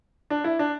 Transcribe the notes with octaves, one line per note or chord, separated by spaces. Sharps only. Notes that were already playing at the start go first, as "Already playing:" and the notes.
D4
E4
D4